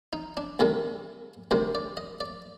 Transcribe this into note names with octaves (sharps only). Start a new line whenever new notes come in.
D#4
D4
D2 C3 D#3 G3 A4
D2 C3 D#3 G3 C5
D5
D#5
D5